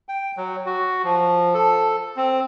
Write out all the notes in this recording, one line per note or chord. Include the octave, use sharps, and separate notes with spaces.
G5
F#3
F#4
F3
A4
C4